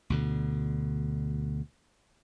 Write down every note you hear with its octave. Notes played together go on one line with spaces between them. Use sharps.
D2 B2 D3